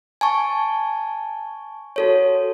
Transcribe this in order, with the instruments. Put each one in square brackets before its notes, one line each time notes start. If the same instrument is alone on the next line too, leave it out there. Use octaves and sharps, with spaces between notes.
[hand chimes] G#5 A5 C#6
F#4 A4 C#5